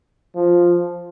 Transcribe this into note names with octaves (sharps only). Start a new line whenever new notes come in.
F3